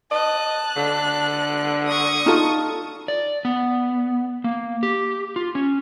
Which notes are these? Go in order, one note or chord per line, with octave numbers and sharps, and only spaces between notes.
D#5 A5 F#6
D3
C#6 D#6
D#4 F4 A4
D5
B3
A#3
G4
F4
C#4